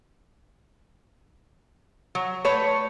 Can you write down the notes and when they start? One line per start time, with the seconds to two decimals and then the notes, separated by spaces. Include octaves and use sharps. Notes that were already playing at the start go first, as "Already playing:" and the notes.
2.15 F#3
2.45 A3 B4 C#5